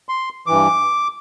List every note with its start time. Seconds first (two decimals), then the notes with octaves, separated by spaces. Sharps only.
0.09 C6
0.46 G2 E3 D6